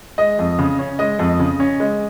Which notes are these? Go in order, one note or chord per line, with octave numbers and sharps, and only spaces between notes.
G#3 D#5
F2
C#3
C#4
G#3 D#5
F2
C#3
C#4
G#3